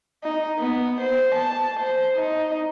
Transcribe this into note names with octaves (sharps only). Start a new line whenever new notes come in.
D#4
B3
C5
A5
C5
D#4